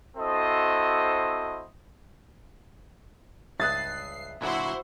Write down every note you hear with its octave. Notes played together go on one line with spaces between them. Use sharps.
C4 E4 F#4 A4 C5 D#5
C#2 G2 E5 D#6 F#6 A6 C7
A#2 D3 F#3 E4 F#4 C5